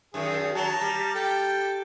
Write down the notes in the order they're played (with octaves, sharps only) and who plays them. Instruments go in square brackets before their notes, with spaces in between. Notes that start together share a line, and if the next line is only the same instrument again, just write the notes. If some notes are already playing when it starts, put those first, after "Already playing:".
[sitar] F#2 D#3 [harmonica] G#4
[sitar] F#3 [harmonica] A5 A#5
[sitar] G3
[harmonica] A4 G5